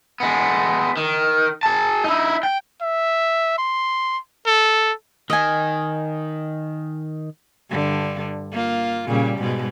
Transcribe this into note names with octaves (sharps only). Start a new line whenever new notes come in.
G#3 B3
D#3
G#4 A5
D#4 E4
G5
E5
C6
A4
D#3 D#5 G#5
G2 D3
A#3 F4
A#2 C#3 G3
G#2 B2 G#3